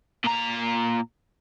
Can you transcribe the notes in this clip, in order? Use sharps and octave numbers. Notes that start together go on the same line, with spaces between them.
A#2 A#5